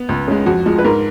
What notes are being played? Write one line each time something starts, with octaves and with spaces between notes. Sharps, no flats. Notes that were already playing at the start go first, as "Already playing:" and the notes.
Already playing: B3
C#2
C#3 G#3
F2 F#4
F3 G#3
B4
G#2 A#4